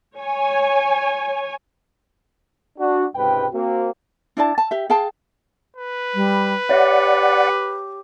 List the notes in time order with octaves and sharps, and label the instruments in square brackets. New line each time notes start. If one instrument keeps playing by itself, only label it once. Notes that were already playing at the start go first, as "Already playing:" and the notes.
[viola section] C#5 G#5
[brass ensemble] D4 F#4
C#2 G#2 C3 B4 G5
A#3 C4 F#4
[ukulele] D4 E4 D5 A5
A5
G4 E5
G#4 F5 G5 A5
[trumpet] B4
[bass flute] G3
[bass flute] G4 [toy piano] C#5 E5 [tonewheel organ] D5 F#5